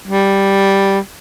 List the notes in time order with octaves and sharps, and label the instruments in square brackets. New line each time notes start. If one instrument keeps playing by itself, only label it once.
[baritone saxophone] G3